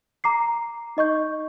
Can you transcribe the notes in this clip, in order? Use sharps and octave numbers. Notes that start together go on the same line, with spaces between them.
A#5 D6 C7
D#4 D#5 C#6 G6